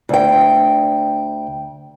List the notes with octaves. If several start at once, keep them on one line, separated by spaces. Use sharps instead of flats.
D2 G5